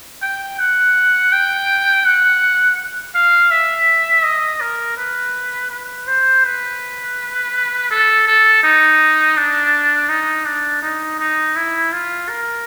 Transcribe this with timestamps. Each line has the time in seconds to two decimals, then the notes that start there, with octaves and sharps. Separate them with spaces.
0.22 G5
0.59 F#5
1.33 G5
2.05 F#5
3.15 F5
3.51 E5
4.24 D#5
4.61 A#4
4.97 B4
5.70 B4
6.07 C5
6.45 B4
7.91 A4
8.27 A4
8.63 D#4
9.37 D4
10.09 D#4
10.46 D4
10.82 D#4
11.20 D#4
11.56 E4
11.93 F4
12.29 A#4